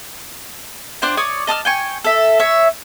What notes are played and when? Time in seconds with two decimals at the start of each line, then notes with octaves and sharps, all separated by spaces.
1.02 D4 F4 C5 G5
1.17 C#5 D5 D#6
1.47 D#5 A5 D#6 F6
1.65 G5 G#5 C#6
2.04 A4 E5
2.39 C#5 E5